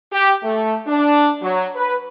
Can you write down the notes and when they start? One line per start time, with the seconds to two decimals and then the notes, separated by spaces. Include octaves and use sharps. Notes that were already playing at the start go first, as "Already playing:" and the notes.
0.12 G4
0.44 A3
0.87 D4
1.42 F#3
1.75 B4